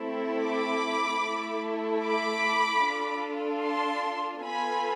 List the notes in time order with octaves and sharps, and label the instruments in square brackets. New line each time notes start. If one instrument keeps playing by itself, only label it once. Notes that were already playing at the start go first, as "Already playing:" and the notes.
Already playing: [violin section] A3 C4 E4 A4
B5 D6
A3 E4 A4
B5 D6
D4 F4 A4
A5 C6
B3 F4 A4 G#5 B5